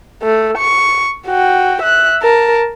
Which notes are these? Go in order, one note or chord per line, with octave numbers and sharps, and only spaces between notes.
A3
C#6
F#4 G5
E5 F#6
A#4 A5